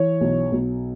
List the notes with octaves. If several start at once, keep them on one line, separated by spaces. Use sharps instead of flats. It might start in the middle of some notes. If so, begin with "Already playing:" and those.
Already playing: E3 C#5
B1
B1